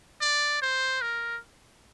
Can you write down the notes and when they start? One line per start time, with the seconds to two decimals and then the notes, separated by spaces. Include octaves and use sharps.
0.21 D5
0.62 C5
1.02 A#4